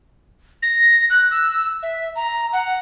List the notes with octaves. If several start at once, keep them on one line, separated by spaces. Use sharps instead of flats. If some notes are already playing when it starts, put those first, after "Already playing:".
A#6
F#6
E6
E5
A#5
F#5